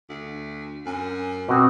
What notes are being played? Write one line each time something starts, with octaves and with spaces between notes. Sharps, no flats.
D2
F#2 G#5
B2 C4 F#4 D6 D#6